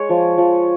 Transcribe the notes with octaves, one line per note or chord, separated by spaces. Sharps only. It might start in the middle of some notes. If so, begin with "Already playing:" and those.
Already playing: G#3 C#5
F3
F3